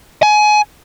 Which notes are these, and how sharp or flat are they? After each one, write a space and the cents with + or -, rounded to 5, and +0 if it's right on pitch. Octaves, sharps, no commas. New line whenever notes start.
G#5 +25